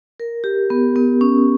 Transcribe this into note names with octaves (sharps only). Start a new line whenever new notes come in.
A#4
G4
B3
B3
C#4